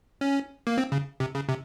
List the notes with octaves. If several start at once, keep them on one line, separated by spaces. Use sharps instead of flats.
C#4
A#3
C4
C#3
C3
C#3
C3